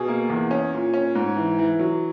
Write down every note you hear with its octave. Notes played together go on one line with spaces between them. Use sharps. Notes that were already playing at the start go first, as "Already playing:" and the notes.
Already playing: B2 G#4
A#3
E2
C#4
A#2
C#4
G#2
E3
E3
F#3